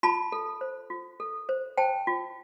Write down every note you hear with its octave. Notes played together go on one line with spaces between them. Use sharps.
F4 A5 B5
A4
C5
F4
A4
C5
C5 G5 A5
F4